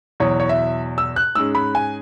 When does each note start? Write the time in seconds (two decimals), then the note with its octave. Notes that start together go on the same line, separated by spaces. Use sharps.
0.20 E2 B2 F#3 C#5
0.40 C#5
0.49 E5
0.98 E6
1.16 F#6
1.35 G#2 G#3 C#4 E6
1.55 B5
1.75 G#5